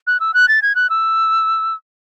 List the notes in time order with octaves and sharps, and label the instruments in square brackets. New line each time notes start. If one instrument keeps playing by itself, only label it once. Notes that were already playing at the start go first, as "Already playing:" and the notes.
[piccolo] F#6
E6
F#6
A6
G#6
F#6
E6